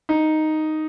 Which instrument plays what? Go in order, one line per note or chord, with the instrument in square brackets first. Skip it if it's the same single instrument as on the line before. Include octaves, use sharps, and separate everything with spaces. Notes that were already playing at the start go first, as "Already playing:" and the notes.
[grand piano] D#4